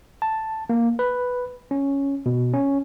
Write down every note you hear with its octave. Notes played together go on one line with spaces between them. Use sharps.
A5
A#3
B4
C#4
B2
C#4